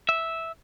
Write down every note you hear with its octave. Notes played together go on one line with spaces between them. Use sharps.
E5